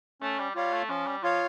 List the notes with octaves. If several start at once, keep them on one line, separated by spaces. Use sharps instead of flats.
A3 C#4
G3
G3 F4 C#5 F5
A3
F3 C#4
G3
F3 F4 C#5 F5